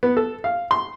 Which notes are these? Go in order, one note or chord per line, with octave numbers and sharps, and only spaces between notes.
B3
A4
F5
C6